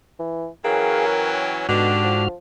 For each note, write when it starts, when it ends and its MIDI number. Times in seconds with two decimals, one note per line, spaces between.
0.19 0.47 52
0.65 1.66 52
0.65 1.66 54
0.65 1.66 61
0.65 1.06 68
0.65 1.40 70
0.65 1.06 77
0.65 1.06 79
1.12 1.54 79
1.69 2.28 44
1.69 1.90 47
1.69 2.23 50
1.69 2.23 62
1.69 2.28 66
1.69 2.23 67
1.69 2.28 89
2.04 2.35 53